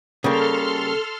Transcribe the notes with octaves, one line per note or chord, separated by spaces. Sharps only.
C#3 G3 A#3 A4 C6 F6